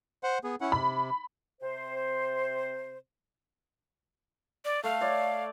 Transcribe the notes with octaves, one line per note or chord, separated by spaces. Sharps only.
C5 F#5
B3 G#4
C#4 E4 F#5
C3 B5
C3 C5
D5
A3 F5
C#5 D5